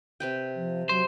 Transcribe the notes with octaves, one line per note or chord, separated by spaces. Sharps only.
C3 B4 G5
F3
F#3 C5